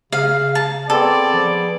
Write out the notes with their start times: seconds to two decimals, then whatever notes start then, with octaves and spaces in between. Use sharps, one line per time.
0.12 C#3 F5
0.55 A5
0.90 B3 C4 G#4 A4 D5
1.33 F3